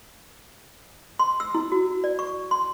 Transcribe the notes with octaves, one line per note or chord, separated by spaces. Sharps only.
C6
E6
E4
F#4
D5
C#6
C6